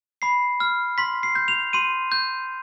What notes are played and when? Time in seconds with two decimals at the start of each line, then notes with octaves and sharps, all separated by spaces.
0.22 B5 C7
0.60 F6
0.98 C6 B6
1.23 C7
1.35 G6
1.48 F7
1.73 C6 D#7
2.12 G6